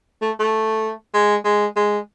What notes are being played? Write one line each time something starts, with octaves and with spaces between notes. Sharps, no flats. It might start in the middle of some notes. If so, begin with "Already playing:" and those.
A3
A3
G#3
G#3
G#3